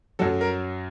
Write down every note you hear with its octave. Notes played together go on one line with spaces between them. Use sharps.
F#2 F#3 A4
A#4